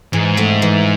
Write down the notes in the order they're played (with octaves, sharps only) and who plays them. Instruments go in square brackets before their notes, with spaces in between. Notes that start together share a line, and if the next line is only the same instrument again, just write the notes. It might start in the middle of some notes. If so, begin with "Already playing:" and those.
[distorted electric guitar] G#2 [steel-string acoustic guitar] E3
[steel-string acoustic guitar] A3 C4
E3